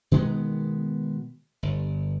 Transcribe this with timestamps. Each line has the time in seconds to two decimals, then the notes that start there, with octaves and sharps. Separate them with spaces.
0.11 B2 D#3 G#3 B3
1.63 G1